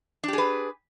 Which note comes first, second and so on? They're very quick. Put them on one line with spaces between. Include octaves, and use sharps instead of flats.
D4 G4 G#4 B4